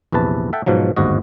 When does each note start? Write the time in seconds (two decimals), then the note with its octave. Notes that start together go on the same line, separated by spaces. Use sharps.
0.12 A#1 E2 C3 B4 A5
0.53 A4 E5 F#5 G5 A5
0.66 G#2 B2 F3 F#3
0.96 G1 D#2 G#2 F#4 D#5